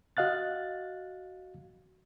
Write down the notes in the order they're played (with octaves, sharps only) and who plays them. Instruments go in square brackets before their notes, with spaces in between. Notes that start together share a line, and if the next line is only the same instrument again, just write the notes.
[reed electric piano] F#4 D#5 F5 F#6 A6